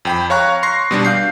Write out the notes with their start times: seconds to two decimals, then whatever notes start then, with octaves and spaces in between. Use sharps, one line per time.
0.05 F2 G5 B5
0.30 C#5 F5 A#5 C#6 F#6
0.63 C6 C#6 A#6 C7
0.91 B2 G3 D4
1.05 F5 G6 C7